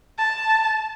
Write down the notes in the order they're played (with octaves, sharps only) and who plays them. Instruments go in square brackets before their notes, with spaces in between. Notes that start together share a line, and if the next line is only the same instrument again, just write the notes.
[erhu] A5